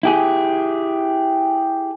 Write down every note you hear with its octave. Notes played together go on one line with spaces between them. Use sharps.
E4 G4 G#4